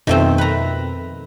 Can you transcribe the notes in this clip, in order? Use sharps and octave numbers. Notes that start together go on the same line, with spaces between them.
F2 B2 D#3 A3 C4
B4 A#5